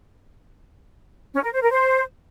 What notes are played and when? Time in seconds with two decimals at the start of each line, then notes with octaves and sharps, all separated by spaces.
1.34 C#4
1.43 A#4
1.53 C5
1.62 A#4
1.71 C5